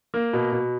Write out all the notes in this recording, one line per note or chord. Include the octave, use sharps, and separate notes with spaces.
A#3
B2
B2